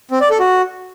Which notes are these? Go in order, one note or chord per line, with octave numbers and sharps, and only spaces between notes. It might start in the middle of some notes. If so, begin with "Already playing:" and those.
C4
D5
A4
F#4